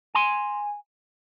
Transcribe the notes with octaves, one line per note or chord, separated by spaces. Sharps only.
G#5 C6